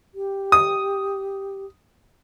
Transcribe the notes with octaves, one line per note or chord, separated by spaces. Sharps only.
G4
D#6